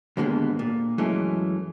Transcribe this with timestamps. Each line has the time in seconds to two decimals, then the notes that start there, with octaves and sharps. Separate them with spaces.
0.17 D#2 G#2 D3 G#3 A#3 B3
0.59 A#2
0.98 F#2 E3 G#3 A3 C#4